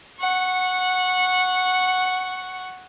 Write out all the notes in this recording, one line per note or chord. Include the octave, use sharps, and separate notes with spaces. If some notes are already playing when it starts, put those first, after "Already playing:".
F#5 C#6